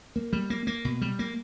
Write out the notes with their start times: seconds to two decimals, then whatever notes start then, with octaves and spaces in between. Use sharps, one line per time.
0.16 A#3
0.33 G3
0.50 A#3
0.67 A#3
0.85 B2
1.01 G3
1.19 A#3